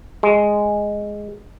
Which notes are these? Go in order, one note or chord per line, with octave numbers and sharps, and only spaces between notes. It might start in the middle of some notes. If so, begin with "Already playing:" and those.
G#3